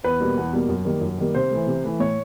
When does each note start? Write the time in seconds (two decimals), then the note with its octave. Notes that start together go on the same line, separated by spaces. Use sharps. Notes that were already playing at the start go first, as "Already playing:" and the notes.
0.04 E2 B4
0.20 B2 G3 A#3
0.37 E2
0.53 B2 G3 A#3
0.69 F#2
0.85 D#3 G3 A#3
1.01 F#2
1.18 D#3 G3 A#3
1.35 C3 C5
1.51 E3 A3
1.67 C3
1.84 E3 A3
1.99 A2 C#5